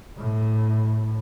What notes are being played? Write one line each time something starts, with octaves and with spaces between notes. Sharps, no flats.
A2